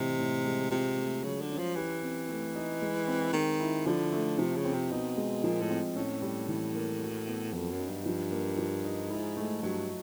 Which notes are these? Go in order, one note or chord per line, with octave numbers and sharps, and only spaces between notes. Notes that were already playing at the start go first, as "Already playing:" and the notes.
Already playing: A2 C3 E3 D#4
A2
G#3
C3 F4
A3
C#3 F#3
D3
C#4
F3
E3 G4
C4
A3
D#4
G#3
C4
D#3 G#3
E4
D3 F3
A3
C3 F3
C#3
C4
C3
B2 D#4
G#3
A#2 F3
A2
C4
A2 C#4
G3
E3
A#3
F#4
B3
F2 F#3
F#2
D#4
G2
F3
A#3
F3
D#4
G#2 E4
A3
G2 F#3